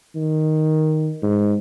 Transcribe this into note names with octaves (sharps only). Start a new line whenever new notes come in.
D#3
G#2